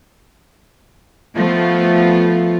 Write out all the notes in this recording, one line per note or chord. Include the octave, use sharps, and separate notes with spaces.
F3 A3 B3 F4